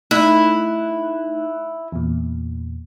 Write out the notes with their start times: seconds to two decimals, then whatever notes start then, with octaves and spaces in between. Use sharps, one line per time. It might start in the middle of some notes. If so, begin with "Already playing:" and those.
0.11 A3 D#4 E4 F#6
1.92 E2 A#2